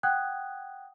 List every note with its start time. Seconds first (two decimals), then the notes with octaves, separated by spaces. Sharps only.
0.03 F#5 G5 D#6 F#6 G#6